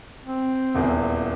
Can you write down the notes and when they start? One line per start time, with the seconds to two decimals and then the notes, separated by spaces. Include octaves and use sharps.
0.26 C4
0.74 D#1 E2